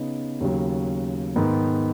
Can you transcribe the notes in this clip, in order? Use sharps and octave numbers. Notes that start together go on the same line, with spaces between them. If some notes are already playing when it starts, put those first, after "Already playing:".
Already playing: C#3 B3 D#4
D#2 C#3 F#3
G#2 D#3 B3